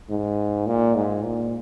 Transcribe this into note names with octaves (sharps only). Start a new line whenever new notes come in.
G#2
A#2
G#2
A#2